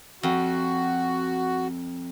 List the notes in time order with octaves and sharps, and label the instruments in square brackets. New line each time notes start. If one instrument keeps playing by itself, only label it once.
[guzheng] F2 [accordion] F#4